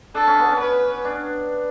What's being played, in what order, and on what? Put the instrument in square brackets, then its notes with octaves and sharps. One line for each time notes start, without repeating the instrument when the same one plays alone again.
[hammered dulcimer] D4 [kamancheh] A4
[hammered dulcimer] C#4
B3
C#4
[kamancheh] B4
[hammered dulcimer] D4